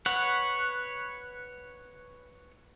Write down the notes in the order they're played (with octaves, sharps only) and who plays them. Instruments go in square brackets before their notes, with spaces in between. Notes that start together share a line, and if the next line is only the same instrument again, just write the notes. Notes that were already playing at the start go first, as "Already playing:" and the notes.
[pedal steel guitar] B4 C#5 F#5